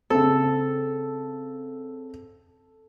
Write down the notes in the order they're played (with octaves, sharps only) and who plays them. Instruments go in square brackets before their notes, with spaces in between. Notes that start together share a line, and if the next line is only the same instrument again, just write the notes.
[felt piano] C#3 C4 [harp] A4